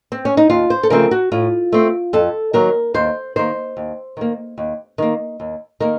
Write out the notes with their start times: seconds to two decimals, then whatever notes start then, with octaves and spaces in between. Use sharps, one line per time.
0.12 C4
0.25 C#4
0.37 D#4
0.50 D#2 F4
0.70 C5
0.83 A4
0.90 C#3 F3 A3 C4 A#4
1.11 F#4
1.32 A2 F4
1.72 A3 C4
2.13 F2 A4
2.53 D#3 F#3 A#3 A#4
2.94 D#2 C5
3.36 D#3 A#3 C5
3.77 D#2
4.17 D#3 A#3
4.58 D#2
4.98 D#3 A#3
5.40 D#2
5.80 D#3 A#3 A#4